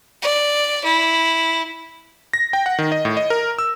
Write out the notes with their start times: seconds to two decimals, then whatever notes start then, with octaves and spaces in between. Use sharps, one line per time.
0.22 D5
0.84 E4
2.33 A#6
2.53 G5
2.66 F#5
2.78 D#3
2.92 D#5
3.05 A2
3.17 D#5
3.30 A#4
3.59 E6